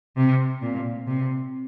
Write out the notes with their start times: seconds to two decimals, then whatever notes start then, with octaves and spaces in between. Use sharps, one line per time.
0.17 C3
0.62 A#2
1.07 C3